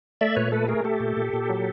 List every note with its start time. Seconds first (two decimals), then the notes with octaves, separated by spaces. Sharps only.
0.21 A3 D5 E5
0.36 A#2 B4 C#5
0.52 A3 A4 B4
0.68 A3 G#4 A#4
0.84 A3 G4 A4
1.00 A#2
1.17 A#2
1.33 A#2
1.49 F#3